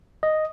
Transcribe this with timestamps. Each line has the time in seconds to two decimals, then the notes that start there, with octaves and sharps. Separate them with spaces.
0.23 D#5